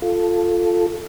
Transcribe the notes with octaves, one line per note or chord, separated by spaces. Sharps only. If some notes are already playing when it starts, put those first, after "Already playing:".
F4 A4